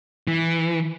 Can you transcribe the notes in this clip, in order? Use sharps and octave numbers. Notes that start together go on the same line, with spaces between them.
E3